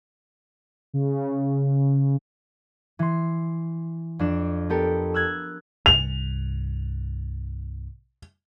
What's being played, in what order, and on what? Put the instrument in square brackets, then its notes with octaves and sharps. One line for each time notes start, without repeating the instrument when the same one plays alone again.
[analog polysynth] C#3
[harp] E3 C6
F2 D4 E7
B3 G4 A4 A#4
E6 F#6 G#6
[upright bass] C2 G2 [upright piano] F7